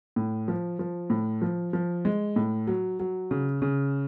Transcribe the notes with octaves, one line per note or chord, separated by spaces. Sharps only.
A2
F3
F3
A2
F3
F3
G#3
A2
F#3
F#3
C#3
C#3